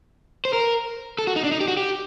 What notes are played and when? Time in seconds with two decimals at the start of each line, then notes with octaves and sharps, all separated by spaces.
0.45 C5
0.53 A#4
1.19 A4
1.27 F#4
1.36 D#4
1.44 D4
1.52 D#4
1.61 G4
1.68 F#4
1.77 G4